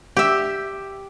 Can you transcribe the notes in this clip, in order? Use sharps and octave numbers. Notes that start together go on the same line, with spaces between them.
G4 E5